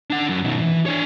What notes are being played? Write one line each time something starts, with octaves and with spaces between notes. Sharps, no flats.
D4 F#5
F#2
B2 D#3
E3
D4 C#5